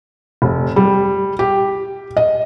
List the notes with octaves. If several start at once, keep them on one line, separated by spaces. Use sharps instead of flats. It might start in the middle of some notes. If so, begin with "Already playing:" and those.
F1
G3
G4
D#5